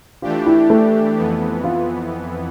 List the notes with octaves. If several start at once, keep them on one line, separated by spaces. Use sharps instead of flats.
E3 A3 D4 F4 G4
E4
A3
F2 E3 B3
F4